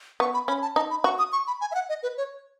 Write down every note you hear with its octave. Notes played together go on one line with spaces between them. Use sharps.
B3 C#6
B5
C#4 B5
A5
D#4 A5
B5
F#4 C#6
D#6
C#6
B5
G#5
E5
F#5
D#5
B4
C#5